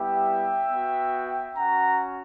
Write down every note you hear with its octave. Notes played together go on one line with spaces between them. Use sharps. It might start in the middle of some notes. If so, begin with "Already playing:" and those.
Already playing: G3 B3 E4 G4 E5 G5
B3 F#4
C#4 F#4 F#5 A#5